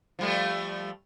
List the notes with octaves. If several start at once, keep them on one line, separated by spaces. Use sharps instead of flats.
F3 G3 A3